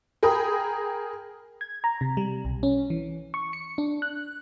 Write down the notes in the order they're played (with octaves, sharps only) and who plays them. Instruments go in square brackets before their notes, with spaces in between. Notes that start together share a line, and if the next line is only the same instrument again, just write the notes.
[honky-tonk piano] G#4 A#4 G5 B5 D#6
[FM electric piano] G#6
A#5
C3
G3
B1
C#4
E3
C#6
C#7
D4
F#6